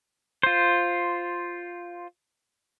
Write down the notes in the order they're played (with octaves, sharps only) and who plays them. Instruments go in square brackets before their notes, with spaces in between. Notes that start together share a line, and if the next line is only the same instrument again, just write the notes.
[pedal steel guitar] F4 C5